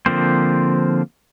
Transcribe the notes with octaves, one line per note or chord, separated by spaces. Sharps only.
D3 F3 A#3 C4 C5